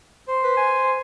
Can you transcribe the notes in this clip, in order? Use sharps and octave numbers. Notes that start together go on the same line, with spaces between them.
C5
B4
G#5